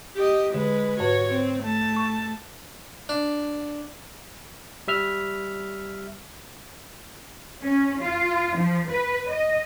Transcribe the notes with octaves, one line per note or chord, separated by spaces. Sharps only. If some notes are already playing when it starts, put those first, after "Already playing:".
G4 D#5
D3 G#3 B4
G#2 F#4 B4 C#5
C4
A3 A5
C#6
D4
G3 E5 F6
C#4
F4
F3
B4
D#5